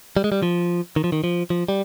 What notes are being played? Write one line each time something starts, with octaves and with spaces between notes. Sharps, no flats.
G3
G#3
G3
F3
D#3
F3
D#3
F3
F3
G3